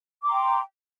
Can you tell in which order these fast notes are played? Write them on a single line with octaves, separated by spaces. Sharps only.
D6 C6 A#5 G5